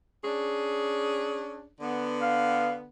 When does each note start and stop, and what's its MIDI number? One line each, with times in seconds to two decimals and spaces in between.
0.24 1.67 61
0.24 1.67 62
0.24 1.67 68
1.80 2.88 50
1.80 2.88 59
2.22 2.72 77